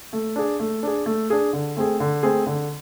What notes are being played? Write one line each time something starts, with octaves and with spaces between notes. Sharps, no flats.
A3
D4 G#4
A3
D4 G#4
A3
D4 G#4
D3
A3 C4 G#4
D3
A3 C4 G#4
D3